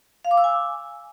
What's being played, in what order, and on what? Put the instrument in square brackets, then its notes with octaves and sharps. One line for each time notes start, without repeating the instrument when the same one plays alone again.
[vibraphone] F5
D6
E6
G#5